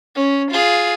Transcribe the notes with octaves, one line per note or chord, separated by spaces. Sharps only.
C#4
F4 G#4